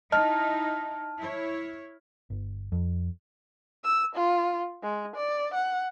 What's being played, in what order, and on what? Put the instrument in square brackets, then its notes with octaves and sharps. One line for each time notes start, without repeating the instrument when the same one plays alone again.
[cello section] D#4 E4 [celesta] D#5 [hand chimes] A5 [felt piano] F6
[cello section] E4 C#5
[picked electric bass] G1
F2
[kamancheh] E6
F4
G#3
D5
F#5